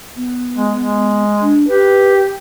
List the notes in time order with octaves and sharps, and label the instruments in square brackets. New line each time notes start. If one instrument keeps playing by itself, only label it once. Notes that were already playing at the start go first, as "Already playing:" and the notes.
[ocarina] B3
[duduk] G#3
G#3
[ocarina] D4
[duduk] G4 [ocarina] B4